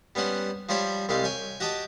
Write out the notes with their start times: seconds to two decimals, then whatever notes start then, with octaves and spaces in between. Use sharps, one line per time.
0.15 G3 B3 C#4 C5 F#5
0.69 F3 G3 C5 C#5 G5 B5
1.09 C2 G3 G#3 G4 F5
1.24 C#5 G5 G#5
1.60 F#4 G4 D#5 G5 A5